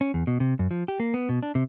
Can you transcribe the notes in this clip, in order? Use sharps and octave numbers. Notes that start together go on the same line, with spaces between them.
C#4
E2
B2
C3
F#2
F3
G4
A#3
B3
B2
D4
C3